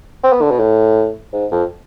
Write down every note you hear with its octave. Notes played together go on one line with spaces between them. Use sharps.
C4
B3
D3
B2
A2
G#2
F2